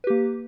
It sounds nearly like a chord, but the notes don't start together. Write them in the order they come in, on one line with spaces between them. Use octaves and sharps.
B4 G4 A#3